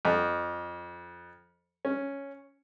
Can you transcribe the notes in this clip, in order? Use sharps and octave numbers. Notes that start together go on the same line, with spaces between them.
F2
C#4